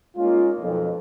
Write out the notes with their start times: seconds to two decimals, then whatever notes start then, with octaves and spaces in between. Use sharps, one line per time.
0.17 G#3 A#3 C#4 D#4 F4
0.61 B1 F2